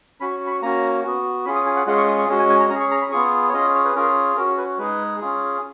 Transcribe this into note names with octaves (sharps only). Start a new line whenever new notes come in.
C#4 F#4 B5
C#6
B5
C#6
A#3 C#4 F#4 A#5
B3 F#4
C#4 F4 G#4 B5
D#6
G#5
F#5
G#3 C#4 F4 G#4 F#5
C#6
D#6
C#6
G#3 C#4 F#4
G#5
G#5
A#5
C#4 A#5
G#4
C#6
A#5
B5
B3 F4 G#4 C#6
C#5
C#4 F4 G#4 D#5
C#5
B4
C#4 F4 G#4 A#4
C#4 F#4 A#4
B4
G#3 D#4 G#4 B4
C#4 F4 G#4